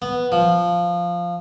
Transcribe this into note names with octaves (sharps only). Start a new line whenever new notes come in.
B3
F3